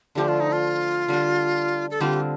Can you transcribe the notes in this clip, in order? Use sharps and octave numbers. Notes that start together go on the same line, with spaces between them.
D3 F3 A3 G4
F4
D#4
F4
D3 G3 D4
A4
D3 G3 C4 F4 G4